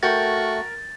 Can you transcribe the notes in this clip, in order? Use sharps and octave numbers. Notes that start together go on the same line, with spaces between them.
A3 F#4 A#4 G5 G6 A6